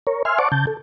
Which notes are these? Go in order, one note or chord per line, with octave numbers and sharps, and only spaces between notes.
A#4 C#5
E5 G#5 C6 F6
C5 D5 F#5 A5 C#6 D6
C#3 A5 G6
A4